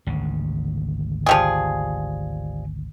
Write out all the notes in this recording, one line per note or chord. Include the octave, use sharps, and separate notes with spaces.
G#1 D2 C#3
F3 G3 G#4